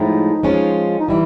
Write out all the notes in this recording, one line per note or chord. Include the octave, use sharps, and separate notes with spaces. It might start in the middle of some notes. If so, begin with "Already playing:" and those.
Already playing: A2 F3 G#3 D#4
F3 G#3 C#4 F4
D#4
E3 G3 E4